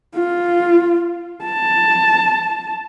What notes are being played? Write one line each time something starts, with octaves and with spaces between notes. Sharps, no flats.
F4
A5